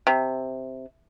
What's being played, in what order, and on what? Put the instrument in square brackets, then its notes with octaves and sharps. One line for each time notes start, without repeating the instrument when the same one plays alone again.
[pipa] C3